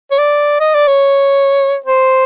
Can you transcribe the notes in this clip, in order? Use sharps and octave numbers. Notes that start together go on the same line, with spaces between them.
C#5
D5
D#5
D5
C#5
C5